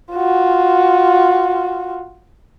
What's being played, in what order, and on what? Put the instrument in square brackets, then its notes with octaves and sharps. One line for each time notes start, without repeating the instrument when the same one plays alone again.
[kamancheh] F4 F#4